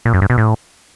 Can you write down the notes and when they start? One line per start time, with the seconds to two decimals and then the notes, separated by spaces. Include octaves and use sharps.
0.05 A#2
0.14 F#2
0.22 G2
0.30 B2
0.38 A2